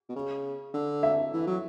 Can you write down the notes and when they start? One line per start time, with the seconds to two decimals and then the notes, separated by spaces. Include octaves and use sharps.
0.09 B2
0.16 C#3
0.73 D3
1.03 E5
1.33 E3
1.47 F#3